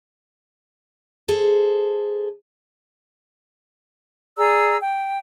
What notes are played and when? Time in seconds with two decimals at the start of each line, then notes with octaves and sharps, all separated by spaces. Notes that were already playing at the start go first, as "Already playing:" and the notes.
1.28 G#4 A4 C5
4.37 G#4 D5 A#5 E6
4.82 G5